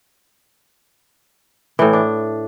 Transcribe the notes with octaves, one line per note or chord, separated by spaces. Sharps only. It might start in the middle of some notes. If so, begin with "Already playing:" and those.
A2 E3
D4